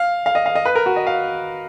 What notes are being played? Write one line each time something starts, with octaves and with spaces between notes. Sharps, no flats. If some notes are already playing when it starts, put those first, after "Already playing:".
Already playing: F5
F5
D#5
F5
D#5
B4
A#4
F#4
D#5
F5